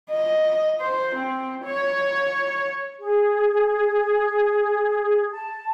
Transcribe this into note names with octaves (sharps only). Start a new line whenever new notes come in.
D#5
C5
C4
C#5
G#4
A5